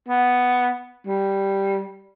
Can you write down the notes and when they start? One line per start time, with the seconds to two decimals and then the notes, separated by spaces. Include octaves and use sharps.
0.08 B3
1.07 G3